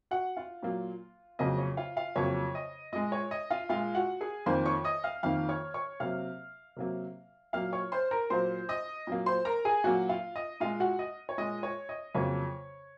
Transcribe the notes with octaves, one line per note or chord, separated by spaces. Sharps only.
F#4 F#5
F4 F5
A#2 F#3 A#3
F2 C#3 F#3 A#3 D#5
C#5
F4 F5
F4 F5
F2 C#3 F#3 A#3 C#5
D#5
A#2 G#3 D#5
C#5
D#5
F4 F5
A#2 G#3 F4 F5
F#4 F#5
G#4 G#5
F2 D#3 A#3 C5 C6
C#5 C#6
D#5 D#6
F5 F6
F2 D#3 A#3 F5 F6
C#5 C#6
C#5 C#6
C3 F#3 A#3 F5 F6
C3 F#3 A#3
A#2 F#3 A#3 F5 F6
C#5 C#6
C5 C6
A#4 A#5
A#2 F#3 A#3 C5 C6
D#5 D#6
A#2 F#3 A#3
C5 C6
A#4 A#5
G#4 G#5
A#2 F#3 A#3 F#4 F#5
F4 F5
D#5
A#2 G#3 F4 F5
F#4 F#5
D#5
C#5
A#2 G#3 D#5
C#5
D#5
F2 C#3 F#3 A#3 C#5